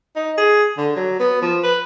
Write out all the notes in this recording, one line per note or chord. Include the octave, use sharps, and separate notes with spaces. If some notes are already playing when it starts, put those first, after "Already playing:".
D#4
G#4
D3
F#3
B3
F3
B4